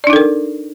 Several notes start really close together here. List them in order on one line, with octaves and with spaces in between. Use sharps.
D5 D4 D#4 A4 A#4